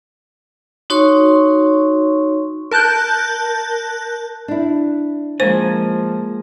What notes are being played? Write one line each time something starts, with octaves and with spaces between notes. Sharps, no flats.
D#4 F#4 C#5 C6 C#6
A#4 A5 F#6 G6
D4 E4
F3 G#3 A#3 C5 G#5